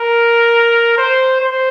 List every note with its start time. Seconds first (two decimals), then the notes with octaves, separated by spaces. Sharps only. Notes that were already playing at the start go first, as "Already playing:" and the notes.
Already playing: A#4
0.97 C5
1.40 C5